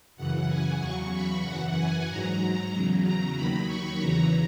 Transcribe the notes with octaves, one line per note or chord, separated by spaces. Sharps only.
F#2 C#3 E3 F#5
G#5
E2 C#3 F#3 C#6
B5
F#2 E3 F#5
G#5
G#2 F#3 A#5
E2 C#3 F#3
A#5
D#2 D#3 F#3 B5
C#6
E2 C#3 E3 A#5